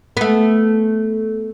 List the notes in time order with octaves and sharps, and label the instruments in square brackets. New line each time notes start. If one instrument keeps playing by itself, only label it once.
[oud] A3 B3